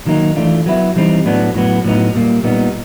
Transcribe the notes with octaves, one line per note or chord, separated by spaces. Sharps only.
D#3 F#3 A#3 D#4
E3 A3 D4 F4
F#3 B3 E4
E3 G3 C4 D#4
A2 F#3 B3 D4
A2 F#3 B3
A2 F#3 B3 D#4
A#2 G3 A#3
A#2 G3 B3 D#4